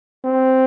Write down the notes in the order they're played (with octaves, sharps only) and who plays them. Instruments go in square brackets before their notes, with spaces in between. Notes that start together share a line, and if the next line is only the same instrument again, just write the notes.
[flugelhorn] C4